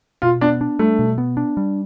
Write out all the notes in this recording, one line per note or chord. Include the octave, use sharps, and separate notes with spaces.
B2 F4
B3 D4
D4
G3 A3
B2
B3
D4
G3